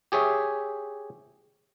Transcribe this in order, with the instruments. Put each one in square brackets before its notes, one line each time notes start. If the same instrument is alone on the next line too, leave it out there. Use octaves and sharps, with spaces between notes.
[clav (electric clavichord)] G4 G#4 C#5 E5